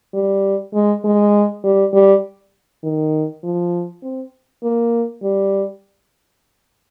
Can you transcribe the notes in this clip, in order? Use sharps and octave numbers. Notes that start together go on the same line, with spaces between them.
G3
G#3
G#3
G3
G3
D#3
F3
C4
A#3
G3